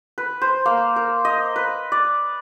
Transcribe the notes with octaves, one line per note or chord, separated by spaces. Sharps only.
B4
C5
A#3
A#4
D#5
B4
D5